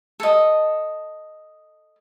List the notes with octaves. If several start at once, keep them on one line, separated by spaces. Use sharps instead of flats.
A4 D#5